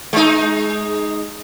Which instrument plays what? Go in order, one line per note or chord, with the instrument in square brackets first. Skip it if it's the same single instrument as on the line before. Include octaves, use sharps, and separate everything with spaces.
[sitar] G#3 D#4